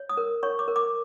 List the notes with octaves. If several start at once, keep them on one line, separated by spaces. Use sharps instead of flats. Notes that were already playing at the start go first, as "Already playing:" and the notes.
Already playing: C#5
D#6
A#4
C#5 C#6
D6
A#4
D6